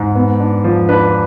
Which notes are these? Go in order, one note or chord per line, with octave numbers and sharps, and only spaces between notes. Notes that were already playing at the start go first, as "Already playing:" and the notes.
Already playing: G#2
B3
D4
F3
D4 B4